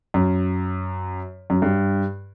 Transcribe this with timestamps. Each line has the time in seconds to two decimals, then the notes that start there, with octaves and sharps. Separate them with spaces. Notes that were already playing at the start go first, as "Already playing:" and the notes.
0.14 F#2
1.50 F#2
1.62 G2